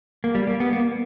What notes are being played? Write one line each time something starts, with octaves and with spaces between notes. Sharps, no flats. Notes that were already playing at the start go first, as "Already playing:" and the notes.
A#3
G3
A#3
B3
A#3